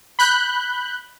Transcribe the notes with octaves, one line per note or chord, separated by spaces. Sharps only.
B5 F#6 G6